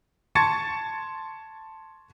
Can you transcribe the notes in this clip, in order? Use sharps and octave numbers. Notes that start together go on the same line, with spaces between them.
A5 C6 C#6 G#6 A6 C#7